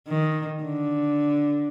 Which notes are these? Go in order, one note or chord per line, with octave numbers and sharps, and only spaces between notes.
D#3
D3